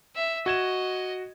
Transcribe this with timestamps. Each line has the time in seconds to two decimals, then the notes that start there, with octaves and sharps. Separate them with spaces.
0.16 E5
0.46 F#4 D#5 G#6 E7